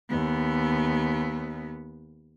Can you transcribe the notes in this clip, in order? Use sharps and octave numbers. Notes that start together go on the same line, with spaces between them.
D#2 B3